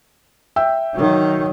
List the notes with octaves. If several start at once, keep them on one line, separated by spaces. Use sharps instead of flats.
E5 G5 E6
D#3 F#3